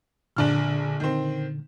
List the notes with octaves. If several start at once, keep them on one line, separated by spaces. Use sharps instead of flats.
A#1 A#2 D3 D4 F6
D#3 C4